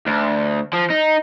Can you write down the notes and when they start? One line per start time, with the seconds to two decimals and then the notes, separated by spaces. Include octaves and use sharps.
0.07 D2
0.73 F3
0.90 D#4